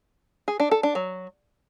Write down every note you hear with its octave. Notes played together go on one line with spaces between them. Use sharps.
G#4
D4
A4
D4
F#3